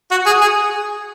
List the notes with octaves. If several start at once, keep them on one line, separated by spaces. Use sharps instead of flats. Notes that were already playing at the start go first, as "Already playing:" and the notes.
F#4
G#4
G#4